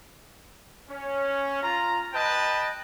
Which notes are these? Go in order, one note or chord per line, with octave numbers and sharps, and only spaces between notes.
C#4
F4 A#5
B4 D#5 G5 A5